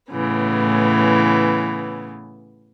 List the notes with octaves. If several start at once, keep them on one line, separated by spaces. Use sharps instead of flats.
A2 C#3 E3 B3